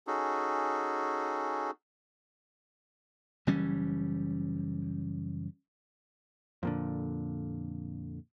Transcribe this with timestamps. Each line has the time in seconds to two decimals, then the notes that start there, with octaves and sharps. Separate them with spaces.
0.07 C#4 D#4 F#4 G#4 A4
3.47 F#1 E3 G3 C#4
6.63 F2 A#2 D3